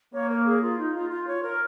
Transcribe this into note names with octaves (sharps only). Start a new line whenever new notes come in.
A#3 C#5
A#4
G#4
F4
D#4
F4
F4
C#5
A#4